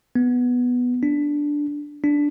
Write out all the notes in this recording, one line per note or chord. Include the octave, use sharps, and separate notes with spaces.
B3
D4
D4